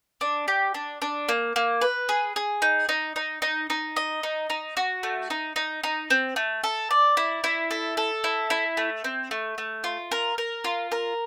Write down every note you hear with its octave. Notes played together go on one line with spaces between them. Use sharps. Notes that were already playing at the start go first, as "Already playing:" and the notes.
D4
G4
D4
D4
A#3
A#3
B4
G#4
G#4
D#4
D#4
D#4
D#4
D#4
D#5
D#4
D#4
F#4
A3
D#4
D#4
D#4
C4
A3
A4
D5
E4
E4
A4
A4
E4
E4
A3
C4
A3
A3
F4
A#4
A#4
F4
A#4